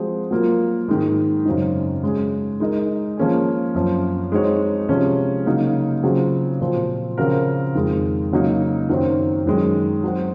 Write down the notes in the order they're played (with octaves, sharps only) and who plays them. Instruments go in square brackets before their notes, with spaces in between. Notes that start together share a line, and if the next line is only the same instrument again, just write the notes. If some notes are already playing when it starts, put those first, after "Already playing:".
Already playing: [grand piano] F3 G#3 C4 F#4 C5
F#3 A#3 F4 A#4
G#2 D#3 G#3
F#2 C#3 F#3 C4 D#4
G#3 C#4 G#4
G#3 D#4 A#4 D#5
F3 A#3 C#4 G#4
F#2 F3 C4
G#3 C4 D#4 F#4 C#5
C3 F3 G#3 C#4
C#3 F#3 A#3 D#4 F#4
C#3 F#3 C4 F4 G#4
A#2 F3 C4
C#3 F3 C4 F#4 A#4
F2 D#3 G#3
C#3 F#3 A#3 D#4
F#2 D#3 F#3 C4
F#2 D#3 G#3
F#3 C4 F#4